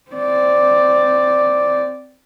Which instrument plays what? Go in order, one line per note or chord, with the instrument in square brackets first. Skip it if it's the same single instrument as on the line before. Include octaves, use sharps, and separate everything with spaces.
[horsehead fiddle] C4 D5